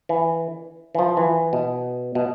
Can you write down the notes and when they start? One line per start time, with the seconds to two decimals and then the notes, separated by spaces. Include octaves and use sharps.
0.09 E3
0.95 E3
0.99 F3
1.17 E3
1.53 B2
2.15 B2